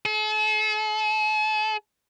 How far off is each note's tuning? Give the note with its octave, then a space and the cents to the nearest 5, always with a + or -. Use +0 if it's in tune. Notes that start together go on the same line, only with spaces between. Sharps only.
A4 -45